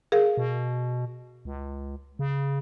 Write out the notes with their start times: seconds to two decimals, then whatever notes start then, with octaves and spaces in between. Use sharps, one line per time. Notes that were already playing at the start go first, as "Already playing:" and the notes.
0.12 G#4 A#4 F5
0.37 B2
1.45 C#2
2.19 C#3